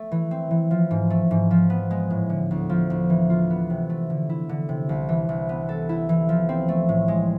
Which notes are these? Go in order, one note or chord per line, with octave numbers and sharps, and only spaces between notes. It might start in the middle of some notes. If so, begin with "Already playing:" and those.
Already playing: A3
E3
C4
E3
F3
G#2
A3
G#2
F3
B3
G#3
A2
D3
D2
F3
D2
E3
F4
B3
C3
A3
D3
E4
D3
C3
C2
E3
C2
B3
A4
E4
E3
F3
C4
A3
A2
G#3